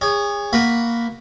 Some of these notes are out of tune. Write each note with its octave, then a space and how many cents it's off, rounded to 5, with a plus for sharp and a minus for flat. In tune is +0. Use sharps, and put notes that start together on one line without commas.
G#4 -30 C#5 +20
A#3 +0 F#4 +0 B5 +0